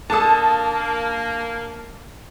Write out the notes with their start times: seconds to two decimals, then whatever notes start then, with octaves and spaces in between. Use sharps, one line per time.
0.10 A#3 D4 A4 A5 D#6